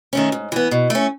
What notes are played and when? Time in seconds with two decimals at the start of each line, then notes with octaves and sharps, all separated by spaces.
0.13 D#3 A3 C#4
0.32 G#2
0.52 E3 B3
0.71 B2
0.90 A3 C#4